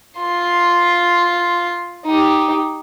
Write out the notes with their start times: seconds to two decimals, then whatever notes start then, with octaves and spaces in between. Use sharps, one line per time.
0.19 F4 C6
2.05 D#4 G4